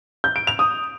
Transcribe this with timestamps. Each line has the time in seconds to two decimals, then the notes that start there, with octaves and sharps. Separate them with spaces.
0.24 G6
0.36 D7
0.47 F7
0.59 D#6